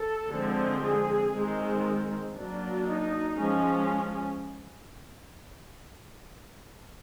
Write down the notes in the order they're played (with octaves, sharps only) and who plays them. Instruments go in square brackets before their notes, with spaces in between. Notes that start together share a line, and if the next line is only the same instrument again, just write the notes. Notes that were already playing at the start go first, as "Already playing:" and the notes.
Already playing: [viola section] A4
D3 F3 G#3 C4
G#4
D#3 G#3 C4
F#3 A#3 D4
D#4
F3 G#3 C#4